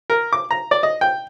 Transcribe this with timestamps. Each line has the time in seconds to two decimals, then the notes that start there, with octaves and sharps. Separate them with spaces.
0.10 A#4
0.33 D6
0.51 A#5
0.71 D5
0.83 D#5
1.01 G5